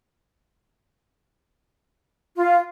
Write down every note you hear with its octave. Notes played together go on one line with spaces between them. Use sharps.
F4